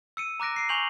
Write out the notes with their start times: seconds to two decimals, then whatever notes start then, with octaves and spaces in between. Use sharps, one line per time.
0.17 E6 C#7 D#7
0.40 A#5 D6 F#6 A#6 D7
0.56 C7 D7
0.69 G#5 C#6 G6 F7 F#7